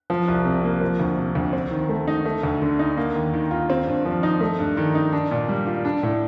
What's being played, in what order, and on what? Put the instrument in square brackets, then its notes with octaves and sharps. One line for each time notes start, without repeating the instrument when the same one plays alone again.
[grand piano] F3
C2
C3
A#3
F3
D2
C3
D2
C4
D#3
A3
D#4
A3
D2
D3
D#4
A#3
D#2
D#3
F4
C4
G2
F3
D#4
A3
G2
D#3
D#4
D4
A#2
G3
F4
D4
A2